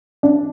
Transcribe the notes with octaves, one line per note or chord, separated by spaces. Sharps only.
D4